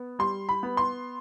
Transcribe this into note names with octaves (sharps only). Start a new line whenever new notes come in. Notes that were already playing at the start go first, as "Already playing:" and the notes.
Already playing: B3
G3 C6
B5
B3
C6